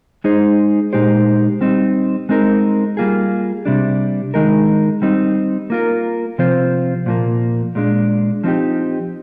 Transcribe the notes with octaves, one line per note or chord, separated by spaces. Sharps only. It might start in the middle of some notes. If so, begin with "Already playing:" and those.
G#3 D#4 G#4 C5
A#2 G#3 D#4 G4 C5
G3 C4 D#4
G#3 C4 D#4 A#4
G3 A#3 F4 G#4
C3 G3 D4
D#3 G#3 D#4 A#4
G3 C4 D#4
A#3 F4 A#4
C3 F3 C4 F4 C5
A#2 F3 A#3
A#2 G#3 D4
F3 C4 D#4 G4